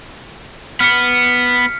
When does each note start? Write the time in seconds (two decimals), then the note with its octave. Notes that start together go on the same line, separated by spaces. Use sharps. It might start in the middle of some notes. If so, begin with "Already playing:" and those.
0.80 B3 F6 B6 C#7